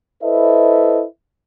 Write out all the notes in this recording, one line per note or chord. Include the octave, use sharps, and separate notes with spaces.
E4 A4 B4 C5 D#5 E5